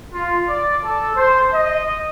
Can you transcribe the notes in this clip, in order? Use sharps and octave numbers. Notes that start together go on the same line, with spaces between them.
F4
D5
A4
C5
D#5